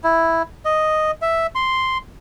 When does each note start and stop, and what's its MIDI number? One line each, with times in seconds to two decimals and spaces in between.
0.04 0.42 64
0.65 1.11 75
1.22 1.47 76
1.55 1.98 84